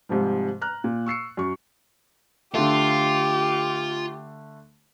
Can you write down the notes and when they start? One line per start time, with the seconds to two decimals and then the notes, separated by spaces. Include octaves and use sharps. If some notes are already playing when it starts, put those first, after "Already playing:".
0.09 G#2 C3 F3 G3
0.61 A#5 F6 F#6
0.84 A#2
1.06 C#6 E6 C7 C#7
1.37 F#2 C#6
2.54 D3 A3 F4 G4